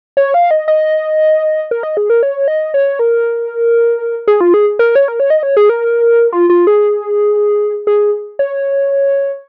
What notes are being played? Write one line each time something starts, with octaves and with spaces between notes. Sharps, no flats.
C#5
F5
D#5
D#5
A#4
D#5
G#4
A#4
C#5
D#5
C#5
A#4
G#4
F4
G#4
A#4
C#5
A#4
C#5
D#5
C#5
G#4
A#4
F4
F4
G#4
G#4
C#5